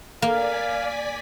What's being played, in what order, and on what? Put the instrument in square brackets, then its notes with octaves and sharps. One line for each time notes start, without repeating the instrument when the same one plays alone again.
[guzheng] A#3 [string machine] D5 G#5 B6 [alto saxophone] F5